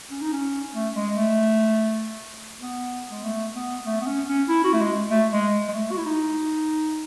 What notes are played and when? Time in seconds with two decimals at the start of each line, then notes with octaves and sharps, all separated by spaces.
0.10 C#4
0.22 D#4
0.33 C#4
0.74 A3
0.95 G#3
1.15 A3
2.61 B3
3.11 G#3
3.24 A3
3.54 B3
3.86 A3
4.01 B3
4.07 C#4
4.28 C#4
4.49 E4
4.64 F#4
4.74 A3
4.80 G#3
5.11 A3
5.32 G#3
5.68 G#3
5.74 A3
5.91 F#4
5.98 E4
6.06 D#4